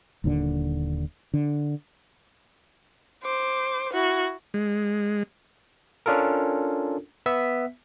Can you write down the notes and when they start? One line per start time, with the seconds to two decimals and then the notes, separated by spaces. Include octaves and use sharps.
0.24 D#1 D#2 A#2 D3
1.34 D3
3.23 C5 D6
3.93 E4 F#4
4.54 G#3
6.06 C#4 D4 F4 A4 A#4
7.26 B3 E5 B6